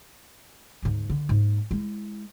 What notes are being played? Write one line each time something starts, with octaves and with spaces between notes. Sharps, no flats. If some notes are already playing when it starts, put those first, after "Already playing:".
D2 G#2
D3
G#2 A#3
G#3 E4